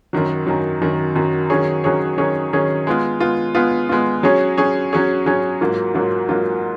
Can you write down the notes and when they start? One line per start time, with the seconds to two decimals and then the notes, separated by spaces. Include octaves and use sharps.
0.13 F#2 D#3 F#3
0.47 F#2 D#3 F#3
0.81 F#2 D#3 F#3
1.16 F#2 D#3 F#3
1.50 D#3 F#3 C#4 G#4 C#5
1.84 D#3 F#3 C#4 G#4 C#5
2.18 D#3 F#3 C#4 G#4 C#5
2.53 D#3 F#3 C#4 G#4 C#5
2.87 G#3 B3 F4
3.20 G#3 B3 F4
3.55 G#3 B3 F4
3.89 G#3 B3 F4
4.23 F#3 C#4 G#4 C#5
4.58 F#3 C#4 G#4 C#5
4.93 F#3 C#4 G#4 C#5
5.26 F#3 C#4 G#4 C#5
5.61 G#2 F#3 A#3 F4
5.94 G#2 F#3 A#3 F4
6.29 G#2 F#3 A#3 F4